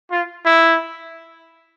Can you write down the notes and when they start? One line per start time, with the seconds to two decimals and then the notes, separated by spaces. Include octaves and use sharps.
0.11 F4
0.45 E4